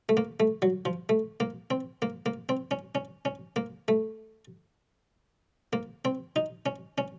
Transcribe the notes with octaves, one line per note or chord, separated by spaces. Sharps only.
A3
A#3
A3
F#3
F3
A3
A#3
C4
A#3
A#3
C4
C#4
C#4
C#4
A#3
A3
A#3
C4
D#4
C#4
C#4